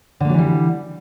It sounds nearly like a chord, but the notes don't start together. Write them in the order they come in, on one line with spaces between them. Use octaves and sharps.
D3 A#3 F#3 E3 G3